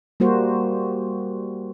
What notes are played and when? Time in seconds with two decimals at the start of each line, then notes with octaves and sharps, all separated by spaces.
0.20 G3 A#3 F#4 C5